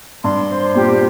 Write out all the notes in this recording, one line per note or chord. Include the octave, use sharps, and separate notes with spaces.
G2 C6
C5
A#2 G4